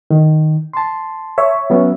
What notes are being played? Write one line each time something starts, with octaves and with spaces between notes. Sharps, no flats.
D#3
A5 C6
C#5 E5
F#3 B3 C#4